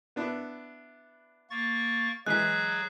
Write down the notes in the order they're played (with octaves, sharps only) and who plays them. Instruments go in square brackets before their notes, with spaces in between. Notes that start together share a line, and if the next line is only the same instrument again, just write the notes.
[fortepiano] B3 D4 E4
[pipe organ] A#3 C#6 A6
[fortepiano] E3 G#3 [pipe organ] F#3 G#4 [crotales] F#6 B6